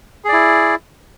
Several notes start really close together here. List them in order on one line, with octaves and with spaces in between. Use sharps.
G#4 D5 E4